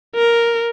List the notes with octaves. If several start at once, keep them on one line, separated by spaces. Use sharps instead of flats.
A#4